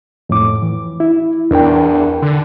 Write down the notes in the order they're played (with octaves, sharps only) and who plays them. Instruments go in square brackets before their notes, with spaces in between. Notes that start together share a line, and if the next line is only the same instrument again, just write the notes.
[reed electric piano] F2 A2 D6
E3
E4
[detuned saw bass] E2 [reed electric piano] D4 A#4 G5
[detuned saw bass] D3